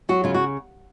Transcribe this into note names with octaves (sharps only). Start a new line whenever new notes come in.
F#3 F#4
C#3 F4
F#4